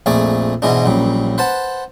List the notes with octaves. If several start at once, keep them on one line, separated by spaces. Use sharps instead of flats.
A#1 F2 A3 G#4 D5
G#2 B2 E3 G#3 D4
A#1 F#2 G3
B4 C5 F#5 A5